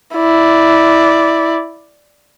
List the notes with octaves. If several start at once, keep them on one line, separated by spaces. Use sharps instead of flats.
E4 D5